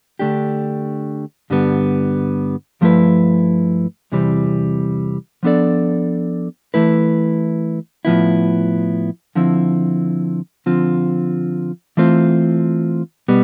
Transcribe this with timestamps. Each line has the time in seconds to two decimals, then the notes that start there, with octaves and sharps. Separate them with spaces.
0.19 D3 A3 D4 G4
1.50 G2 D3 G3 B3
2.81 G2 F3 A3 E4 B4
4.12 E2 C3 E3 G3 C4
5.43 F3 B3 D4 A4 D5
6.74 E3 A3 E4 B4
8.05 A2 F3 B3 E4
9.36 D3 F3 C4 E4
10.66 D3 F3 C4 F4
11.97 E3 A3 C4 F4 C5
13.28 B2 G3 B3